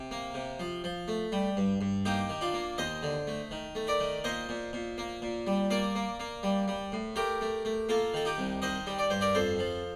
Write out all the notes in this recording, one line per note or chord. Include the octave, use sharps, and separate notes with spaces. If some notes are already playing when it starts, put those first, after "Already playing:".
Already playing: C3
A#3
C3
F3
F3
A3
G3
G2
G2
A#3 D#4 G4
D#3
D4 F4
A#3
D#2 C5 D#5
D3
A3
D#3
A3
A#4 D5
D#3
A#2 C5 D#5
A#2
A#2
A#3
A#2
G3
A#3 A#4 D5
A#3
A#3
G3
G3
A2
A3 G4 A#4
A3
A3
A#3 F4 A4
D#3 A4
D#4 G4
C2
D#3 C5 D#5
G3
D5
G2 C5
A#4 D5
F2 A4 C5
F3